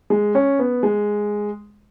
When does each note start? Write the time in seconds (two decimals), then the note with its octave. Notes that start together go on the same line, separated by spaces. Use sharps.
0.10 G#3
0.35 C#4
0.59 B3
0.83 G#3